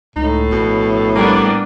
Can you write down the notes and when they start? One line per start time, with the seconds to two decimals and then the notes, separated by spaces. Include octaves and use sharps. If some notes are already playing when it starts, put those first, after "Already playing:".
0.16 C#2 A2 D#4
0.52 A#1 B2
1.15 G3 A#3 B3 D4